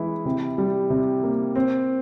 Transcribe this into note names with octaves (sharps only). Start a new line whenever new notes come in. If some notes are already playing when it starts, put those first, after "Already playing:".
Already playing: E3 G#3 E4
C3
G3
C3
A#3
C4